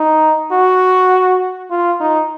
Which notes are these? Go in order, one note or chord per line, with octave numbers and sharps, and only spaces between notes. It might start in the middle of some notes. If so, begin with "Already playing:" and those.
Already playing: D#4
F#4
F4
D#4